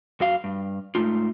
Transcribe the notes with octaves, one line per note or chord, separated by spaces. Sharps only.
F#2 F#4 F5
G2
G#2 A3 D#4 F4